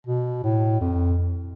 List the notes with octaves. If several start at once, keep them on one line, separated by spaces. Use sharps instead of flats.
B2
A2
F2